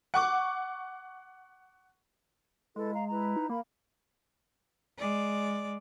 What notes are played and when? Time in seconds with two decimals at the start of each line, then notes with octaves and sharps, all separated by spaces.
0.14 F#5 C#6 D6
2.76 G#3 E4 A4 B4
2.94 F5 A#5
3.09 E4 B4 A#5
3.36 D#4
3.50 A#3 A#4 B5
4.99 G#3 D5